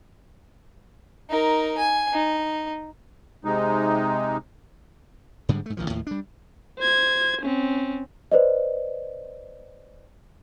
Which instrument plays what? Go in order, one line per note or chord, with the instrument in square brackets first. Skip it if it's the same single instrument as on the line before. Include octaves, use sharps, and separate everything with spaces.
[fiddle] D#4 A#4
G#5
D#4
[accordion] C3 G#3 D#4
[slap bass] G#2 D3 G3 G#3
G#2 A3
A1 D#3 F3
D#2 A2 F3
G3 D4
[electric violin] C5 G#6
C4 C#4
[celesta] B4 C5 D5 D#5